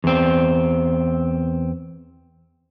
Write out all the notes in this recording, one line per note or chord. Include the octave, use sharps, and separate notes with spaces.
E2 C4